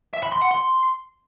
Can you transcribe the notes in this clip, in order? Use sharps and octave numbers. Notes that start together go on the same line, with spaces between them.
E5
B5
C6
F#5
C6